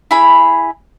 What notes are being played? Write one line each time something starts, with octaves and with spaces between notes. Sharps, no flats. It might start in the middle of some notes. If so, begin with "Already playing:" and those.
E4 G#4 B5